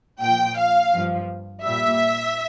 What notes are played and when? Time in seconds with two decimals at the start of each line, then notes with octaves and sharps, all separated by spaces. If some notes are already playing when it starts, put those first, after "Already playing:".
0.21 A#2 F3 G5
0.58 F5
0.93 G2 F3
1.64 A#2 G3 E5